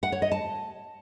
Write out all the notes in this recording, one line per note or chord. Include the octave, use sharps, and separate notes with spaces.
F#5
C#5
D#5
A5